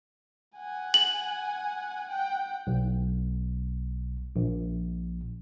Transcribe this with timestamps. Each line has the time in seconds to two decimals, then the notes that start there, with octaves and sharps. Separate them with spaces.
0.57 F#5 G#5
0.94 F#7
2.08 F#5 G5
2.67 B1
4.36 A#1